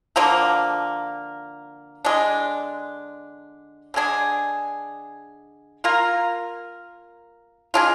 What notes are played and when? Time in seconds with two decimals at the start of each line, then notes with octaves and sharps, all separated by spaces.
0.16 D3 F3 A#3
2.05 D3 G#3 D4
3.94 D3 G#3 D4 G#4
5.84 A#3 F4 A#4
7.74 G#3 D4 F4